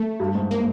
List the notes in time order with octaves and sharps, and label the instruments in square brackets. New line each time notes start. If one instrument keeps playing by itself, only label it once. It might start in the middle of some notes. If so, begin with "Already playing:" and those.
Already playing: [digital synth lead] A3
[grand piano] G2
G#2
[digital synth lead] A#3